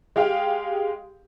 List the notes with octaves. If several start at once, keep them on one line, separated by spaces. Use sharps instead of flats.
G#3 G4 F5 G5